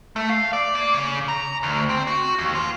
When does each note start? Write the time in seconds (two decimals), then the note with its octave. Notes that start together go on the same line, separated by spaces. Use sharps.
0.16 A3
0.30 F5
0.53 D5
0.75 A#3
0.94 C#3
1.28 A#5
1.63 D2
1.89 C4
2.07 F#4
2.39 D#2
2.55 F4